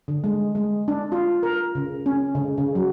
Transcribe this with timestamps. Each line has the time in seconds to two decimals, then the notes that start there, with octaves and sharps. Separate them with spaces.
0.08 D3
0.24 G#3
0.55 G#3
0.88 D4
1.12 F4
1.43 A#4
1.75 C#3
2.06 C#4
2.35 C#3
2.58 C#3
2.75 F#3